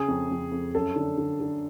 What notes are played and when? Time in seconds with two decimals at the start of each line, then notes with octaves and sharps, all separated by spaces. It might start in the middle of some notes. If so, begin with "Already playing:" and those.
Already playing: C#3 G#4
0.08 F2
0.31 F2
0.52 F2
0.74 F#2 A4
0.96 D3
1.17 D3
1.40 D3